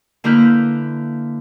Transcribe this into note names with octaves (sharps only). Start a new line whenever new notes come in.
D3 A#3 E4 B4 F6 G6